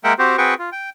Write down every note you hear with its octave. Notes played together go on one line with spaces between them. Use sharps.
G#3 A#3 A#4 E5 F#5 G5
C4 F#4 G4 C5
C4 F#4 G#4 B4 G5 C#6
F4
G5